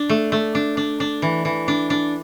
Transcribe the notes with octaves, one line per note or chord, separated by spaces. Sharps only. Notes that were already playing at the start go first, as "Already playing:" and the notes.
Already playing: D4
A3
A3
D4
D4
D4
E3
E3
D4
D4